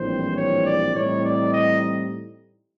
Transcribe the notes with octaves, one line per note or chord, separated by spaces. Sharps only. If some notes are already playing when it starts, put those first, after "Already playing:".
Already playing: A#1 A2 E3 G3 C4 C5
C#5
D5
A2 E3 G3 C4 D#4 C#5
D5
D#5